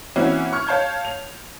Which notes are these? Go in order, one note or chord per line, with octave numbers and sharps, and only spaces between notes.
E3 A#3 C4 C#4 E4 F#4
C#6 F6 G#6
C#5 F5 A5 G6 G#6
F7